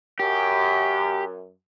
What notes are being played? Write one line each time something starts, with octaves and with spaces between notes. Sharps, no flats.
F#2 G4